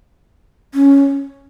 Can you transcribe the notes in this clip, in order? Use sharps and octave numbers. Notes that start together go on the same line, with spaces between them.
C#4